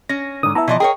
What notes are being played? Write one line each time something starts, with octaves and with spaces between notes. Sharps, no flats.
C#4 A#6
G#2 D3 D#6
B3 E4 E5 A5 A#5
B2 E3 F3 D5 D#5
G#4 A#4 C#5 G5